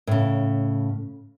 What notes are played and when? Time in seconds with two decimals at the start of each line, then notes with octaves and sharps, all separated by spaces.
0.07 A2 C#3